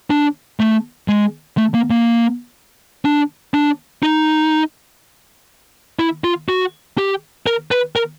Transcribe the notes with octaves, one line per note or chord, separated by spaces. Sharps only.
D4
A3
G#3
A3
A#3
A#3
D4
D4
D#4
E4
F4
F#4
G4
A#4
B4
A#4